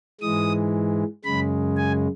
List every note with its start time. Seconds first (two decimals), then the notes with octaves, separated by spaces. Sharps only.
0.21 G#2 E3 G#3 D#6
1.24 F#2 C#3 G#3 B5
1.77 G#5